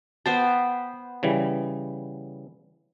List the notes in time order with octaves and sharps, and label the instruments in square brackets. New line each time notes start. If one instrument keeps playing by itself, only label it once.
[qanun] B3 C5 G5 [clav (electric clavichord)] A5
[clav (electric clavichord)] C#3 E3 G3